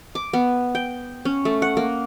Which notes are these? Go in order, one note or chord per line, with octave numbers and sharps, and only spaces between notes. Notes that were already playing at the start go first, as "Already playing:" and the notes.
D6
B3
G5
C#4
A3
F#5
A#3